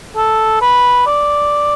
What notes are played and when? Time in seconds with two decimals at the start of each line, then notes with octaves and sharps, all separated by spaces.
0.17 A4
0.62 B4
1.06 D5